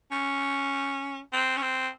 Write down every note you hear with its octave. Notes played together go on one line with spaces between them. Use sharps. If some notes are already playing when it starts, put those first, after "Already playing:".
C#4
C4
C#4
C4